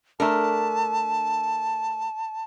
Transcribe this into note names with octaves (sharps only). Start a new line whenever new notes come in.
A3 D4 A#4 A5